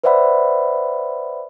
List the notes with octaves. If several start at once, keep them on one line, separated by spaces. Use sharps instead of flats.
B4 C5 D5 E5 F#5 B5